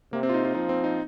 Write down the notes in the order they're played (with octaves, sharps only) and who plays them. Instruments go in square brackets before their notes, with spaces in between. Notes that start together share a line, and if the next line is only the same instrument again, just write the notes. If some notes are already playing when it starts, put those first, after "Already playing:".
[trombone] C3 [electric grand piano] A#3
[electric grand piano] C4
F4
D#4
F4
[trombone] F3 [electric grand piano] D#4
[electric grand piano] C4
D#4